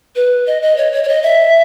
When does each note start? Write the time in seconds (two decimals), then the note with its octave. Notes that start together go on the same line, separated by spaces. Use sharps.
0.16 B4
0.47 D#5
0.62 D#5
0.77 C#5
0.92 C#5
1.04 C#5
1.08 D#5
1.23 E5